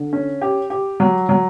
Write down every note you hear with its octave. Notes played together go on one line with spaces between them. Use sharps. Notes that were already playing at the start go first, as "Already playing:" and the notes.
Already playing: D3
C#4
G4
G4
F#3
F#3